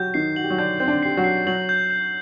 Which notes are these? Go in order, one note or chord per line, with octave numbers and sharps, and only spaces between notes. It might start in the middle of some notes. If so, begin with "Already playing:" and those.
Already playing: F#3 F#4 G4 G6
D#3 D#4 C7
F#4 F#7
G4
F#3 F#4
D3 D4 G6
C4 G6
D3 D4
G4 C7
F#3 F#4
C7
F#3 F#4 F#7
G6
G6